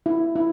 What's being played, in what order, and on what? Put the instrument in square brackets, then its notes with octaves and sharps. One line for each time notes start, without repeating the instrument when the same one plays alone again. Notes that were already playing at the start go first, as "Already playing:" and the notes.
[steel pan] E4
E4